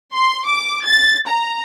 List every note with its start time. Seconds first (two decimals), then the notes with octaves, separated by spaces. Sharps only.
0.13 C6
0.46 D6
0.85 A6
1.28 A#5